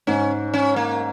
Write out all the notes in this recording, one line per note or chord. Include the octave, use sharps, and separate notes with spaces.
G#2 C#4
C#4
A#3